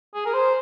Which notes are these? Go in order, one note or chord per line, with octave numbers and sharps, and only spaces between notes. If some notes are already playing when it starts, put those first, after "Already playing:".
G#4
A#4
C5